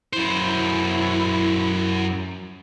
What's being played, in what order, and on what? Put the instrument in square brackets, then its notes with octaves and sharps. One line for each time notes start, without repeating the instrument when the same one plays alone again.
[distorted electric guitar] F#2 C5 [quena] E4